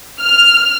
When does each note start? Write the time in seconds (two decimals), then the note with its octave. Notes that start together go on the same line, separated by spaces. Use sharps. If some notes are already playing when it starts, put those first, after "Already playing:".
0.21 F6